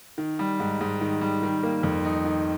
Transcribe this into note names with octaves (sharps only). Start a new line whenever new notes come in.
D#3
G3
G#2
G#2
D#3
G3
D#3
A#3
F2
D#4
D#3